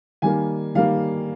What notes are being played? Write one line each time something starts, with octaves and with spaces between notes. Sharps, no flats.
D#3 G3 A#3 G#5
D#3 G3 A#3 F5